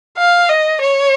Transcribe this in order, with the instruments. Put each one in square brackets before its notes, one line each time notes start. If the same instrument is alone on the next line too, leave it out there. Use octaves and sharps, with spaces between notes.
[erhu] F5
D#5
C#5